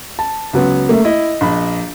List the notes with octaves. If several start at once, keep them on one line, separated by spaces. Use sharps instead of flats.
A5
C#2 F#3 B3
A3 A#3
E4 D#5
A#1 B5